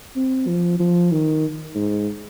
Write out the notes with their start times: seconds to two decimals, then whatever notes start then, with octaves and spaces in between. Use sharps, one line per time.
0.16 C4
0.48 F3
0.80 F3
1.12 D#3
1.75 G#2